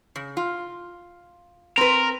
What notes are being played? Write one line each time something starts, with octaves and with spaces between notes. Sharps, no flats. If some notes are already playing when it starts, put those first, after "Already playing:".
C#3
F4
C4 A#4 B4